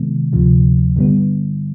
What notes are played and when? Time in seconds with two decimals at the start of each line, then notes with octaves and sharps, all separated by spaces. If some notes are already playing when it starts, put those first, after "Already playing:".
Already playing: C3 D#3 G#3 B3
0.33 D2 C3 F3
0.96 G2 D3 G3 B3